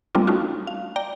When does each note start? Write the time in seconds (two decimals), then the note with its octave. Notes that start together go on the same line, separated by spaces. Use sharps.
0.15 G3 A3 A#3 C4 D4 F4
0.27 A3 C#4 D#4 F4 F#4
0.67 F5
0.96 D5 G5 A#5